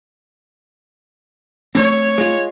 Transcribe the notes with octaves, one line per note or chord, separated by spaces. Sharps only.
A3 B3 C4 C#5
G#3 F4